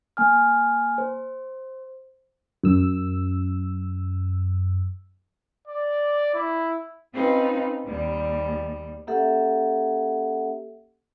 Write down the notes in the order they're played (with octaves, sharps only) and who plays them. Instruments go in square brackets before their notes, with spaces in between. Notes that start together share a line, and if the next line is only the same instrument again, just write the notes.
[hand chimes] A#3 G#5 F6
C5
[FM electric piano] F#2 E6
[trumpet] D5
E4
[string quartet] C4 C#4 D#4 F4 B4
D#2 G3
[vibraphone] A#3 C#4 G4 A4 E5 F#5